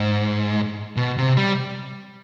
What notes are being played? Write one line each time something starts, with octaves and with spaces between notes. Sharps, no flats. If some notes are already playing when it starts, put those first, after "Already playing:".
Already playing: G#2
B2
C3
G3